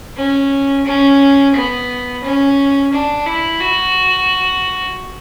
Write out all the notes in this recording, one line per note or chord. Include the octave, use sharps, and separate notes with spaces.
C#4
C#4
B3
C#4
D4
E4
F#4